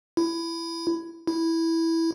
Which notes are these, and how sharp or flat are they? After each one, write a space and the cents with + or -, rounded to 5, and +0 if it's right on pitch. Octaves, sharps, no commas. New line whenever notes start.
E4 +15
E4 -5